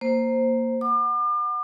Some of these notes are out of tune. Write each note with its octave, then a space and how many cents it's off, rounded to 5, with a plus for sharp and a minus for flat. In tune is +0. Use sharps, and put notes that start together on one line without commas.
A#3 +0 C5 +5
F#5 +0 D6 +40